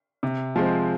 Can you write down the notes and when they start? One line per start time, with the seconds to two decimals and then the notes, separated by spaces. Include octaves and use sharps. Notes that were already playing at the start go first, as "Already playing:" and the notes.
0.23 C3
0.56 F3 G#3 C4